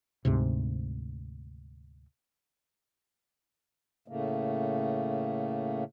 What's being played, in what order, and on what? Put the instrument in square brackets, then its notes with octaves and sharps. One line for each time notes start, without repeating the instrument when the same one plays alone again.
[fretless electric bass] D2 G#2 C3
[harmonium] A2 C#3 A3 A#3